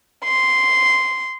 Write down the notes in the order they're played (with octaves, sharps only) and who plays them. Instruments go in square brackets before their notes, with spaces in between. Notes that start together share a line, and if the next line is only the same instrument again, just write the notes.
[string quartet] C6